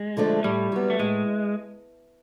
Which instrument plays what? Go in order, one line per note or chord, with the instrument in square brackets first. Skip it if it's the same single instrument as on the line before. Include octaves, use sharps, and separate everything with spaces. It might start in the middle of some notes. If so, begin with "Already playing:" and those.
Already playing: [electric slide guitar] G#3
[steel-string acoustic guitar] D3 F3 A3 D4
[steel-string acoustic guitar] A2 [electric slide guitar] G3
[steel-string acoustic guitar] F#3 B3
[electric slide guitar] A3
[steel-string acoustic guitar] A2 [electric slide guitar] G#3